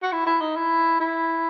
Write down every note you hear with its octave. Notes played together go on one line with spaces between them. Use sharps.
F#4
E4
E4
D#4
E4
E4